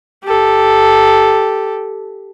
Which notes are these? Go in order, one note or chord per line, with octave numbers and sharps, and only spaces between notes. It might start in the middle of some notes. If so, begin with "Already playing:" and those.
G4 A4